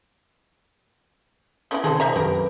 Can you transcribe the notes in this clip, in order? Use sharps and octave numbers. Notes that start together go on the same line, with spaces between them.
C#3 B3 E4
C3 D#3 G#4 A4 C5
C5 E5 A#5
C2 F#2 D3 G4 A#4 B4